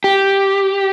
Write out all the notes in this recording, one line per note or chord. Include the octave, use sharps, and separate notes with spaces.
G4